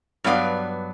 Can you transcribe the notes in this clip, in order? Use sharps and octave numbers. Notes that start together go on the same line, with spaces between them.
G2 F#3 B3 D5 F5